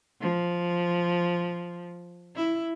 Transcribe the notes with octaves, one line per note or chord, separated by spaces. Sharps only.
F3
E4